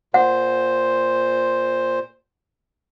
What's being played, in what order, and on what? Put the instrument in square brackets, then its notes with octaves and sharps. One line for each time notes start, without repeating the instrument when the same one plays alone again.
[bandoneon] A#2 C5 [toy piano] F#5